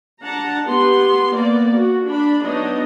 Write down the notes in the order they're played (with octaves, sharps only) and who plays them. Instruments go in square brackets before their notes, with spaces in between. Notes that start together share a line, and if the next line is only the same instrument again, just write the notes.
[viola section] D4 F#5 A5 A#5
B3 G4 C6
A#3 B3 D5
F#4
D4 B5
F#3 B3 D4 D#4 D#5